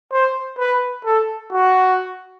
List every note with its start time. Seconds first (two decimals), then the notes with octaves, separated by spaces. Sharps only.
0.12 C5
0.58 B4
1.05 A4
1.52 F#4